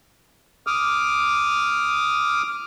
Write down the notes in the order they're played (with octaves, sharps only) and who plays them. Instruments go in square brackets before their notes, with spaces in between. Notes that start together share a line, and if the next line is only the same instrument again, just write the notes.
[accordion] D6 D#6 F6